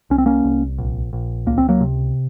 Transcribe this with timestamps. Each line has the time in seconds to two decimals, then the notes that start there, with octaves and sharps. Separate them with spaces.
0.10 C2 C#4
0.18 C4
0.26 A#3 C#4
0.44 C2
0.78 A#1
1.13 A#1
1.46 C#2 A#3
1.58 C4
1.69 F#3 A#3
1.80 C3